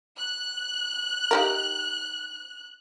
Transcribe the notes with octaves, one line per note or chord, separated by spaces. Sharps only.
F#6
D#4 G4 A#4